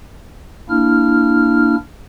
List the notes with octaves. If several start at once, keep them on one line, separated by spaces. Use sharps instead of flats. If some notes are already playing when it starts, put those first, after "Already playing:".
A#3 D4 E4 F6